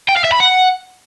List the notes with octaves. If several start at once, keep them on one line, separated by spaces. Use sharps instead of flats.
G5
F5
E5
B5
F#5